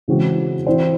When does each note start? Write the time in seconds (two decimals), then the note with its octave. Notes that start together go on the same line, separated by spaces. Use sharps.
0.08 C#3 E3 G#3 C4 F#4
0.67 E3 C4 E4 C5